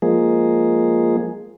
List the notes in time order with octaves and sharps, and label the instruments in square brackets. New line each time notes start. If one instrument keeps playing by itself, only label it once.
[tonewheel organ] F3 G#3 A#3 G#4